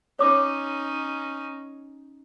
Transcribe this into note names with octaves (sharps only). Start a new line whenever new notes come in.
C#4 D#4 C#5 D6